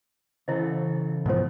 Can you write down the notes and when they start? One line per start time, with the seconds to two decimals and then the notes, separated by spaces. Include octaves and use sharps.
0.48 C#3 E3 E4 A4 C5 D#5
1.26 G#2 B2 F3 D#4 C5